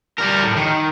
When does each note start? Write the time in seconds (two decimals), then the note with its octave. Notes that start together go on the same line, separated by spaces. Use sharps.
0.18 G3 A#4
0.43 A2
0.57 D#3